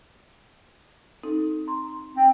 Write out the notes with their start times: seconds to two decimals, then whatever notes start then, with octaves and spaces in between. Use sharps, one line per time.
1.23 C4 D#4 A4
1.67 A#5 C6
2.16 C4